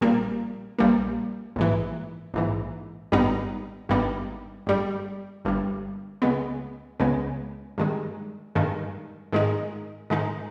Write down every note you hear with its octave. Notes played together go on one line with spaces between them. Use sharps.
A#1 A#2 G3 A#3
A#1 A#2 G3 A#3
A#1 G#2 E3
A#1 G#2 E3
G#1 G2 G3 B3 D#4
G#1 G2 G3 B3 D#4
G1 G2 G3
G1 G2 G3
C#2 C#3 G#3 B3
C#2 C#3 G#3 B3
G2 D#3 G#3
G2 D#3 G#3
G#2 D#3 G#3 D#4
G#2 D#3 G#3 D#4